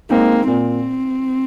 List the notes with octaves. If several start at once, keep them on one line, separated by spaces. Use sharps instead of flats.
G#3 A#3 C4 D#4
A#2 C4